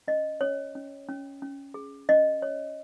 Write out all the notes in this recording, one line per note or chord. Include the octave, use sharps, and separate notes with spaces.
C#4 D#5
C#4 C#5
C#4
C#4
C#4
G#4
C#4 D#5
C#5